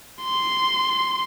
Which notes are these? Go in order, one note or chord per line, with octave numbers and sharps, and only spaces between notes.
C6